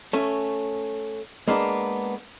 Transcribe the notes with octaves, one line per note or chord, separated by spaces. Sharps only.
A3 C#4
G#3 A#3 B3 D4